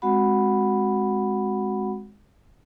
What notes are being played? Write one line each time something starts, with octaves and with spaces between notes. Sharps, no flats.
G#3 C4 F#4 F#5 B5